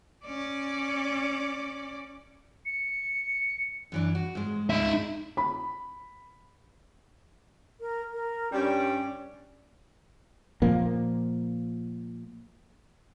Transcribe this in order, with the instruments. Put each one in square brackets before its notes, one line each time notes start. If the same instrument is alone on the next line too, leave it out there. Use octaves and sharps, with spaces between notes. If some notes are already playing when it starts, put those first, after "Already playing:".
[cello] C#4 D5
[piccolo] C#7
[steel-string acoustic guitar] F#2 E3 D4
F#4
G#2 G#3
[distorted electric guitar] D#4 E5
[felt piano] B5
[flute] A#4
A#4
[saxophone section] G2 G3 [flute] C#4
[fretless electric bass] A#2 F3 A#3